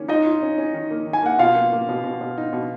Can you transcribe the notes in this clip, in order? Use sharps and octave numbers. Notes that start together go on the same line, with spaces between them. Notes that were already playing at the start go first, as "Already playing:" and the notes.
Already playing: D#3 A#3 C#4
D#4 F4 D#5
F4
C#4
C#4
D#3
A#3
D#3
G#5
A#3 F#5
B2 F4 F5
A#3
A#3
B2
B2
B2
D#4
B2